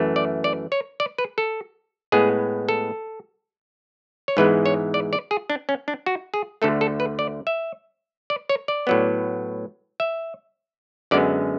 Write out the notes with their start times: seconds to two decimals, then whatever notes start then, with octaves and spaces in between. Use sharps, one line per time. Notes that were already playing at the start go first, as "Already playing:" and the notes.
Already playing: F#2 E3 A3
0.16 D5
0.44 D5
0.72 C#5
1.00 D5
1.18 B4
1.38 A4
2.12 A2 G#3 B3 G#4
2.69 A4
4.28 C#5
4.37 G#2 E3 G#3 B3 B4
4.66 C#5
4.94 D5
5.13 D5
5.31 G#4
5.50 D4
5.69 C#4
5.88 D4
6.06 F#4
6.34 G#4
6.62 D2 D3 A3 A4
6.81 A4
7.00 B4
7.19 D5
7.47 E5
8.30 D5
8.49 C#5
8.68 D5
8.87 A2 F#3 B3
10.00 E5
11.11 F#2 D3 G#3 B3 D5